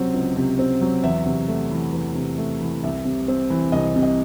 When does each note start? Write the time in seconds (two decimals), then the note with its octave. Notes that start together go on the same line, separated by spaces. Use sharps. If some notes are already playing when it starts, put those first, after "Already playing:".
Already playing: C#2 C3 F#3 C4
0.14 C#2
0.36 C3
0.59 C4
0.81 F#3
1.03 E2 E5
1.26 C3
1.48 A3
1.71 E3
1.93 E2
2.15 C3
2.38 A3
2.61 E3
2.84 C2 E5
3.05 C3
3.28 C4
3.50 E3
3.72 C2 D#5
3.96 C3
4.03 D#5